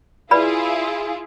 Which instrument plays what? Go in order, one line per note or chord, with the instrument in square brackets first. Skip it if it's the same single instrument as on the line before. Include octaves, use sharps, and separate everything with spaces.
[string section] E4 F4 G#4 [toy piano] B4 D5 B5